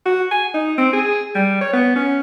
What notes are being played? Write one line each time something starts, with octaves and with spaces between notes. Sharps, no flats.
F#4
G#5
D#4
C4
G#4
G3
C#5
B3
C#4